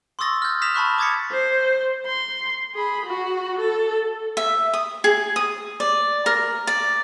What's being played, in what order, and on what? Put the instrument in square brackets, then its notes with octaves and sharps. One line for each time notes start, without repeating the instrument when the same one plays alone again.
[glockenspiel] C6 C#6 D#6 E6 A6 A#6
F6 G6
D#6 F6 A#6 B6 E7 F7
A5 B5 C#6 F#6
D6 D#6 G#6 A6 B6 C#7
[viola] C5
C6
G#4 B5
F#4
A4
[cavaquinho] E5
D#6
G#4
D#6
D5
A#4
D5